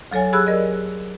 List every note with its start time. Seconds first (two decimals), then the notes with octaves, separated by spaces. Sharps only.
0.11 D2 F#3 A4 C#5 G#5
0.33 G4 G#4 B5 E6 F#6
0.47 A#4 D5 D#5